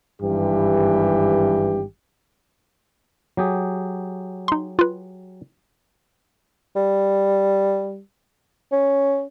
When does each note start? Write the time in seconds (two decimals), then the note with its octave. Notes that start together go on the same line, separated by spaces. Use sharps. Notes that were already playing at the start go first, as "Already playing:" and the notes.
0.22 G#1 G2 E3 G4
3.37 F#3 G4 G#4
4.48 D#4 C6
4.79 F4 B4
6.76 G3
8.72 C#4